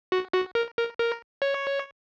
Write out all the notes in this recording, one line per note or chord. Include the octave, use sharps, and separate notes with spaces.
F#4
F#4
A#4
A#4
A#4
C#5